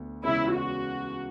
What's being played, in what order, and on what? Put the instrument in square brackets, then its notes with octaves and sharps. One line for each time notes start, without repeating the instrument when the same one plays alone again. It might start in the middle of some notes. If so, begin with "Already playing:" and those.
Already playing: [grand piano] D2 B3
[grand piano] E2 C#3 G#3 C#4 [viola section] E4
[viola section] F#4